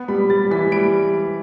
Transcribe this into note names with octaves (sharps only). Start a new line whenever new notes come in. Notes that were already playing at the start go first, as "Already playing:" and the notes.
Already playing: B3
G3 B5
G3 A6
E3 B6
G3 D7